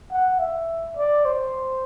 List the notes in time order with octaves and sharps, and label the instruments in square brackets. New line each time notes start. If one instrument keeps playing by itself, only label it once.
[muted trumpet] F#5
E5
D5
C5